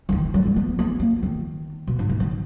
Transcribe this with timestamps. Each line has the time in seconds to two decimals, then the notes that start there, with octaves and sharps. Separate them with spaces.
0.09 E3
0.12 D#3
0.34 F#3
0.46 G#3
0.56 B3
0.79 B3
1.00 A#3
1.23 D#3
1.88 B2
1.99 G#2
2.09 B2
2.20 D#3